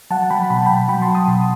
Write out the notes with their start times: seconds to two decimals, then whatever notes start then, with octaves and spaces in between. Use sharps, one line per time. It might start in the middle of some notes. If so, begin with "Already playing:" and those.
0.10 F#3 F#5 A5
0.30 F#3 G5 B5
0.50 B2 B5
0.58 A5
0.66 B2 G5 B5
0.88 F#3 G5 B5
1.02 A5 C6
1.08 F#3
1.15 B5 D#6
1.28 B2